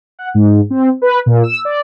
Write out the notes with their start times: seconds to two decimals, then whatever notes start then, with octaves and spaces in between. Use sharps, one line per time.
0.19 F#5
0.34 G#2
0.70 C4
1.02 B4
1.26 A#2
1.43 E6
1.65 D5